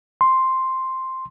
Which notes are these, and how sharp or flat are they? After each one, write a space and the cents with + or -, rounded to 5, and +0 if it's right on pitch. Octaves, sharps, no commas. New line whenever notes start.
C6 +0